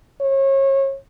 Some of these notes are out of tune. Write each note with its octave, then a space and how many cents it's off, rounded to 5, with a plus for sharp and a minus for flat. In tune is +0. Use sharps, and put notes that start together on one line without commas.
C#5 -30